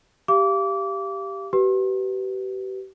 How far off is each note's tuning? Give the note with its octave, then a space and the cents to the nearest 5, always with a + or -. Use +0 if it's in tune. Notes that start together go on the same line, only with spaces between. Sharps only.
G4 +0 F5 -30 D6 -25
G4 -35 B4 +0